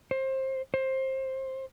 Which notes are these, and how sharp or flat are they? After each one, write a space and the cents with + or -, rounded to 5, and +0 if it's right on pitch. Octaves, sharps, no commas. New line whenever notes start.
C5 +25
C5 +20